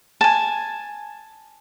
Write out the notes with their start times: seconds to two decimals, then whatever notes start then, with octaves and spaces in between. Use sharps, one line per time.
0.21 G#5 A5